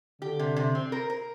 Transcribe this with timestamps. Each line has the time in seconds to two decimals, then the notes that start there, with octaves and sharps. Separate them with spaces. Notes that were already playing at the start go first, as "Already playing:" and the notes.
0.21 D3 G4
0.39 C3
0.56 C3
0.75 C4
0.92 A#4
1.10 A#4